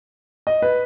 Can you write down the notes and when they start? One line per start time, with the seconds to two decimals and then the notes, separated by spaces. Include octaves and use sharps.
0.47 D#5
0.62 B4